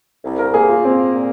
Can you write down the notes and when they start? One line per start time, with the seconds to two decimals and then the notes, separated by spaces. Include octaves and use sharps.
0.24 C2
0.39 A#4
0.54 A#3 G#4
0.69 F4
0.84 A#3 C4
1.14 A#2